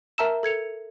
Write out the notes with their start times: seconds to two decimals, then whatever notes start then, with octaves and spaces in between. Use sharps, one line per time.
0.18 A#4 E5 A5 A#5 E6 E7
0.43 A4 G#6 C#7 F7